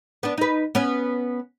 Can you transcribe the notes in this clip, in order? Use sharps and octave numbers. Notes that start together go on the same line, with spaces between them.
B3 D4
D#4 B4
B3 C#4